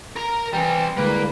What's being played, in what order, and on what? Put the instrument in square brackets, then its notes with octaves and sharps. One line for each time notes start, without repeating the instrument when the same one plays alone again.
[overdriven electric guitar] A#4 A#5
[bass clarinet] E3 [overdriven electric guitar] G3 C4 [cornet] G5
[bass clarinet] C2 [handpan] D3 G#3 [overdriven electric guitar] A#3 [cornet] B4